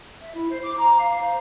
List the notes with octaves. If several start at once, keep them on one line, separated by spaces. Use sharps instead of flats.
E5
E4
C5
D6
A#5
F5
C5